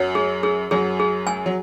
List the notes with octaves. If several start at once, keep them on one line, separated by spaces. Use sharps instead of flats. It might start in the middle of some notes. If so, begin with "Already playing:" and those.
Already playing: F#2 F#3 C#5
G#4
G#4
F#2 F#3 G#4
G#4
G#5
F#3